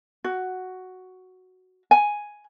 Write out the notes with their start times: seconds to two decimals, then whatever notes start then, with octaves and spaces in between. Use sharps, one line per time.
0.24 F#4
1.91 G#5